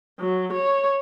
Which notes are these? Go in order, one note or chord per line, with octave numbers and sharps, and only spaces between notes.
F#3
C#5